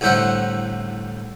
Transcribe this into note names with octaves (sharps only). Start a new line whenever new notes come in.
C2 A2 D3 C5 E5 F#5